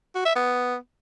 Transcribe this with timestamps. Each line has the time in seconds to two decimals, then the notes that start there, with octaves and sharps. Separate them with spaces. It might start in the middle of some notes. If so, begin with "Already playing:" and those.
0.15 F#4
0.26 E5
0.36 B3